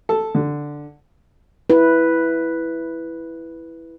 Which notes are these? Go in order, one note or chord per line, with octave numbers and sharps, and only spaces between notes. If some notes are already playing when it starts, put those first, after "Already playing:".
A4
D3
E4 B4